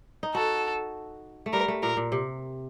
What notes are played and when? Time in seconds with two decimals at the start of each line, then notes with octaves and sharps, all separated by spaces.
0.23 D#4
0.34 F#4 A4
1.46 A3
1.53 G3 A#4
1.68 A3
1.82 A#2 A#4
1.97 A#2
2.12 C3